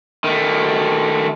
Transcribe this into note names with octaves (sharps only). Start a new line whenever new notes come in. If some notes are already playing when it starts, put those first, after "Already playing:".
D#3 A3